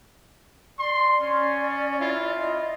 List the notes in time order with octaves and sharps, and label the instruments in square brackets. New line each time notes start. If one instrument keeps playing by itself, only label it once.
[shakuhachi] D5 [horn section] C6
[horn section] C#4
E4 F4
[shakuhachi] D#5